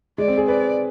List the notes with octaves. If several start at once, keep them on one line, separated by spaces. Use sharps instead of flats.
G#3 D5
C4
G#4
B4 D5